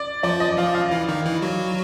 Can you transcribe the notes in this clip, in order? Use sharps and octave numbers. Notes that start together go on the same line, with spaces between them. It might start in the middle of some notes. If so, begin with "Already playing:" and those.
Already playing: D5
F3 F4 D5
D#5
F3 F4 F5
F5
E3 E4
D#3 D#4
E3 E4
F#3 F#4